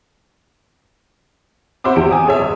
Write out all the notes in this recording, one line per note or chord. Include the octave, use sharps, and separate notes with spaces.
F#4 C5 E5 B5 D6
E2 E4 G4 D7
G#5 D#6
G#4 A4 C#5 E5
G1